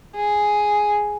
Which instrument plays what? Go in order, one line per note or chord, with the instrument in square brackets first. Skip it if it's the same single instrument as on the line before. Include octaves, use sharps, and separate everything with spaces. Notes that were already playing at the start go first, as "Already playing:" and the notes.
[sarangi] G#4